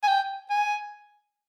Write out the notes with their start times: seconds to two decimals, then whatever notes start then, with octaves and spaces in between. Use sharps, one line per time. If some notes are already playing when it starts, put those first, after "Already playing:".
0.03 G#5
0.08 G5
0.50 G#5